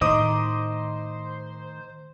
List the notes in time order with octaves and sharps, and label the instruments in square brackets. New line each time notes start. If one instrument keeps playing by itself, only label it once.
[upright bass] A2 [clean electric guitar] D#3 [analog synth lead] C5 [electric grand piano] D#5 D6 D#6